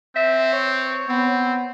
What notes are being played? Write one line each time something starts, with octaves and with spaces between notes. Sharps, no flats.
C4 E5
C#5
B3 C4